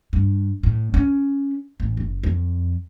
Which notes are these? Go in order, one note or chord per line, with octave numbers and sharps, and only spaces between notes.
G2
A2
C#4
A1
F#1
F2